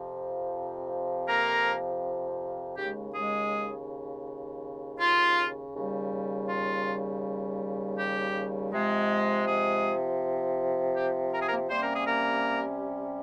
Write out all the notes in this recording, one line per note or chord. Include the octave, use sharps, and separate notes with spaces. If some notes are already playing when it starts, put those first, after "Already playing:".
Already playing: F2 C3 F3
A#3 A#4
D#2 C#3 G#3 G4
G#3 G#4
F4
D#2 C#3 G3
F4
G4
C3 F3 G#3
G#3 G#4
G4
A#4
G#4
A#3 A#4
C3 G3 A#3 C#4 C5
A#4
G#4
A#3 A#4